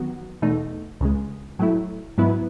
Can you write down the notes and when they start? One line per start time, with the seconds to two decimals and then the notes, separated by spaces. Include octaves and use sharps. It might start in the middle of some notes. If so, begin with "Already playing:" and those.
Already playing: D#3 F#3 B3 F#4
0.42 E2 B2 A3 D#4
1.00 C#2 C#3 G#3
1.59 A2 F#3 A3 E4
2.18 G#2 F#3 B3 E4 B4